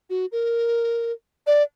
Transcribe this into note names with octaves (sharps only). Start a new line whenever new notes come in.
F#4
A#4
D5